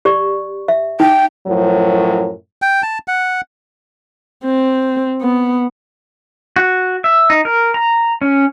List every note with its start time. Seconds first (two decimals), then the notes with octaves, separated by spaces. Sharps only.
0.05 G4 D5 C#6
0.68 E5
1.00 D#4 G5
1.46 F#2 A2 F3 F#3
2.62 G5
2.83 A5
3.08 F#5
4.45 C4
5.22 B3
6.56 F#4
7.04 E5
7.30 D#4
7.45 A#4
7.74 A#5
8.21 C#4